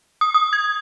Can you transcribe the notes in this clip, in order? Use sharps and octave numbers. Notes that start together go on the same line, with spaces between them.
D#6
D#6
G#6